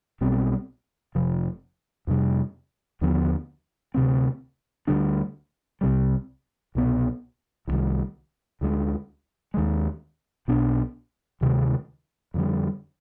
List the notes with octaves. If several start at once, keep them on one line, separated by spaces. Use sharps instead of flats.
B1 B2 G3 C4
F1 F2 C3 F3
F2 C3 G3
D#2 D3 F3 B3
D2 C3 G3 C4
D2 D3 G3 D4
C2 C3 G3
C2 B2 B3
C2 C3 D#3 G3
D2 D3 G#3
D#2 D#3 G#3
B1 B2 B3 D4
D2 C3 D#3 G#3
F2 D3 G3